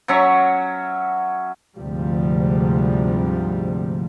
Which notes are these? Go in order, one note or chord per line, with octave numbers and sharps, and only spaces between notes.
F#3 C#4 E5 C#6
D2 G#2 C3 F3 G3